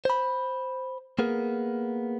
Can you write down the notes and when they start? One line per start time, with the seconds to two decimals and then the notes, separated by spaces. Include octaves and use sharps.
0.05 C5 B5
1.19 A#3 B3 G#4 A#4